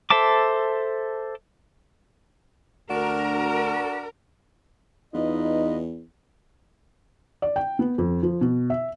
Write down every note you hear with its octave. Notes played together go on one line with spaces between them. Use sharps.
A4 C5 E5 A5 D6
D2 D4 F#4 A#4
E2 D#4 F4 B4 D#5
D5
G5
B3
F2
F3
B2
E5